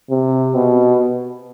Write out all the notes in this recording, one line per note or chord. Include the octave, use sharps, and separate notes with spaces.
C3
B2